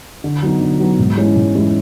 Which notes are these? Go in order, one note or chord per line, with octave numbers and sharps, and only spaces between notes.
D3
F#3 B3 D#4
D3
F#3 B3 D#4
G#2
E3 G#3 C#4 E4
G#2
E3 G#3 C#4 E4